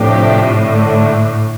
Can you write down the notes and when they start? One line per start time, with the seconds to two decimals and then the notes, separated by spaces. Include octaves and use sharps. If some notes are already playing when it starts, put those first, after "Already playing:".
Already playing: A2 C3 F3 A3 D4 G4
0.53 D3 A3 D4